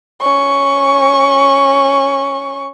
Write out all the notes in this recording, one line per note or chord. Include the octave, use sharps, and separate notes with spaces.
C#4 C#6